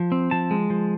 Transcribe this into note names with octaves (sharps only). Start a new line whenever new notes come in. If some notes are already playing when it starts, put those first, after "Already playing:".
Already playing: F3
C4
F3 A5
G#3
F3